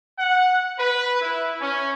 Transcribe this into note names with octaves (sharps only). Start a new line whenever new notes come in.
F#5
B4
E4
C#4